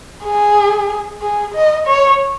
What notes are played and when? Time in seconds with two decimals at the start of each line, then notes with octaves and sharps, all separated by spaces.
0.24 G#4
1.22 G#4
1.54 D#5
1.87 C#5